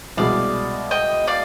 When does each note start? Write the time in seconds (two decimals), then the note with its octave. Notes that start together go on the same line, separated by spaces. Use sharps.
0.17 C2 B2 G#3 D5 F5
0.91 D#5 G5
1.27 D5 F5